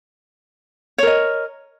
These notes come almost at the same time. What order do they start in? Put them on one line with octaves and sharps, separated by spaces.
C#5 A#4 D#5